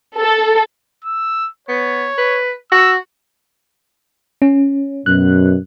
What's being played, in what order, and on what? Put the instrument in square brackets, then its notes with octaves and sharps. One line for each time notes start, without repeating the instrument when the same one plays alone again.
[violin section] A4
[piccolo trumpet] E6
[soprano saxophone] B3 [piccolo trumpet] C#5
[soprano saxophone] B4
[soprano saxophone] F#4 [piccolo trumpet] E6
[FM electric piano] C#4
[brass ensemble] F#2 B2 [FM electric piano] F#6